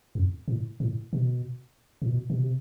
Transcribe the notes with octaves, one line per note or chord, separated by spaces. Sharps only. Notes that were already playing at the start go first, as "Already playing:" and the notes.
F2
A2
A2
B2
A2
B2
B2
C3